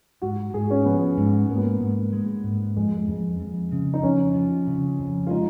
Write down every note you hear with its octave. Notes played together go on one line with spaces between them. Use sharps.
G#2 F#4
G#2 G#4
C#4
F3 B3
G#2
G#2 A#3
B3
A#3
G#2
G#3 A#3
G#2
F2 G#3
G#3
F2
F2
C#3
D#4
F2 C#4
F3
C#3
F2
F4
G#3 D#4